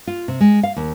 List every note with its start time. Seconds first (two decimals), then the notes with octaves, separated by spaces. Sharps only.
0.07 F4
0.28 C3
0.40 G#3
0.63 F5
0.76 D#2